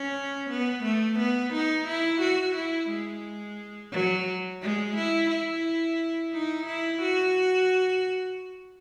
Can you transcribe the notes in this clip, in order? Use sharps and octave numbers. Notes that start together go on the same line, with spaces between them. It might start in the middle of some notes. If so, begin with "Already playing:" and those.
Already playing: C#4
B3
A3
B3
D#4
E4
F#4
E4
G#3
F#3
G#3
E4
E4
D#4
E4
F#4